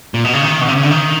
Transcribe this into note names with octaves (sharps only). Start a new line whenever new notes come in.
A#2
B2
C#3
D#3
B2
C3
C#3
D3
D#3